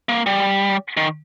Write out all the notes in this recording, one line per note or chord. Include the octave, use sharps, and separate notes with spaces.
A#3
G3
D#3